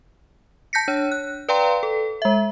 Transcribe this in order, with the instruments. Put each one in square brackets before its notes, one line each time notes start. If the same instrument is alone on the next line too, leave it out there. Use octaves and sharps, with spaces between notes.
[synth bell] A5 G6 A#6 B6 C#7
D4 C#5
F#6
B4 D5 F5 G5 A#5 C6
A4
G#3 E5